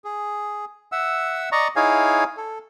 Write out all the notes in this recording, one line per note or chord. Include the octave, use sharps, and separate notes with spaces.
G#4
E5 F#5 E6
D5 D#5 A#5 C#6
D#4 E4 G#4 C#5 F5 G#5
A4